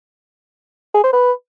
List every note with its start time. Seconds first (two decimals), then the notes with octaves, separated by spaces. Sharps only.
0.95 G#4
1.04 C5
1.13 B4